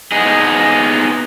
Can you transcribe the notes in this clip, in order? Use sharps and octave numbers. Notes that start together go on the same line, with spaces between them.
B3 D#4 G#4